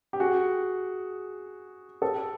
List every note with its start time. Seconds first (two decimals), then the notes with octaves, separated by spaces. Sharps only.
0.13 G4
0.20 F#4 G#4
2.02 G4 A4